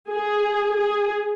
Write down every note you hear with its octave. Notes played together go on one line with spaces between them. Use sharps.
G#4
G#4